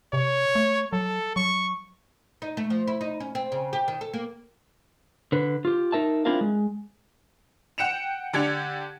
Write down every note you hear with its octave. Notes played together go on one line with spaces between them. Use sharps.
C3 C#5
A3
F#3 A4
F#3 C#6
D#4
A3
F3
E4
D#4
C#4
C4
C#3
G4
D#3
A4
A#3
D3 B4
F4 G4
D#4 A#4 E5 A5
C4 D4 E4 F4 A#4 F5
G#3
F#5 G5 C#7 E7 F7
D3 D4 G4 G#6 C#7 F7